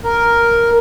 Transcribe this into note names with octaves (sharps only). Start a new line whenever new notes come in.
A#4